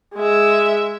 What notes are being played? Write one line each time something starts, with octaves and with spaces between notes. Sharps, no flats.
G#3 E5